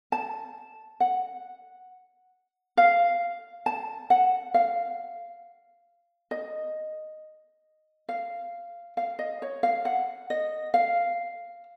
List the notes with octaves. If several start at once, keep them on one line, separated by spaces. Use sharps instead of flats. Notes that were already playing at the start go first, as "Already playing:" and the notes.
A5
F#5
F5
A5
F#5
F5
D#5
F5
F5
D#5
C#5
F5
F#5
D#5
F5